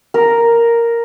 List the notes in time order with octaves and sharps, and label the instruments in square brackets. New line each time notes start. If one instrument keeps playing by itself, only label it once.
[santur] A#4